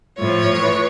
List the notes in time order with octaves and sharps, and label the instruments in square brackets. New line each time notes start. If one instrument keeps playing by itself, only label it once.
[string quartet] A2 F3 C#5
E3